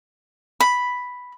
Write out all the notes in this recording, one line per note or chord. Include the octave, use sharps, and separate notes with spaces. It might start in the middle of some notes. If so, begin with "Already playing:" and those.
B5